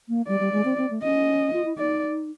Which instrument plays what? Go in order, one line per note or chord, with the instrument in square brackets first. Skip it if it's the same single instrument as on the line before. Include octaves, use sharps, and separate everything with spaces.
[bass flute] A#3
[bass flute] G3 [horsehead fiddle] D5
[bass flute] G3
G#3
C4
C4
A3
[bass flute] C#4 [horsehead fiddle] D#5
[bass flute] F4
E4
[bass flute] D#4 [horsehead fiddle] D5